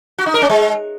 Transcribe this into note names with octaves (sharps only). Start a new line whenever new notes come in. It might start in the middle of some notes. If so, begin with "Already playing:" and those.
F#4
D#4
A#4
C#4
G#3